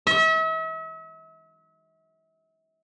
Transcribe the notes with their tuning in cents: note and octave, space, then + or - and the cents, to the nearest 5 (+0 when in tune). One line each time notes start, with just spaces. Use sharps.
E5 -40